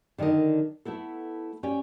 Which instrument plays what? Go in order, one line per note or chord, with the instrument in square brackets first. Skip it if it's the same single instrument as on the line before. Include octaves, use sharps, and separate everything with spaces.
[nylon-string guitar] D3 D#3 D4 A#4 D#5
A3 B3 E4 A4
C#4 G4 D5 G5 G#5